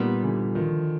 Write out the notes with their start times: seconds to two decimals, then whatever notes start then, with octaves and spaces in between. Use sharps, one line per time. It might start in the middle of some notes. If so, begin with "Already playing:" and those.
Already playing: A#2 G3 B3 D#4
0.23 D3 E3
0.55 D#3 F3